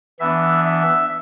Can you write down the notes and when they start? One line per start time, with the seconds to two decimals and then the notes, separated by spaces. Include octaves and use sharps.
0.20 E3 B3 D4 E5
0.65 E5